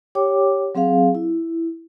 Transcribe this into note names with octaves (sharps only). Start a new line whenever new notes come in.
G4 C#5 G5 D6
F#3 C4 G#4 F5
E4